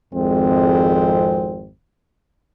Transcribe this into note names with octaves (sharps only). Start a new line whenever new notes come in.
G#1 F2 G#3 C4